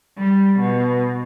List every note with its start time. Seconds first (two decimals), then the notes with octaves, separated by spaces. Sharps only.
0.18 G3
0.60 B2